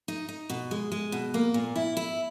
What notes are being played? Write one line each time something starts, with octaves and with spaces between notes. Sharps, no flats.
D#4
D#4
B2
G#3
G#3
B2
A#3
A#2
E4
E4